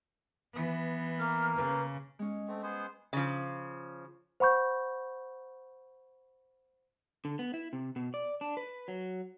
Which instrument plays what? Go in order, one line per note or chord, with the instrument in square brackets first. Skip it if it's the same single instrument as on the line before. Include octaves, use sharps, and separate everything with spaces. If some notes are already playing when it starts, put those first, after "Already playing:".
[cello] E3 B3
[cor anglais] A#3 [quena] F6
[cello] C#3 [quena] B4
[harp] G#3 C#4
[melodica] A3 C4
B3 G#4 C5
[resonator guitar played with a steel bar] C#3 F3
[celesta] C5 F#5 B5 C#6 G6
[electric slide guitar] D3
B3
E4
C3
B2
D5
D4
B4
F#3